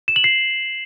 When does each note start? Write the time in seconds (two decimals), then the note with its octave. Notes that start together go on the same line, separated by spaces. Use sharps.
0.08 E7
0.16 F#7
0.24 C7